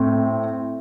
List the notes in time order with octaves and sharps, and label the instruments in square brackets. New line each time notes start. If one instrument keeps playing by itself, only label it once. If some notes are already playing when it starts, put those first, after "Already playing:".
Already playing: [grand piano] A2 C4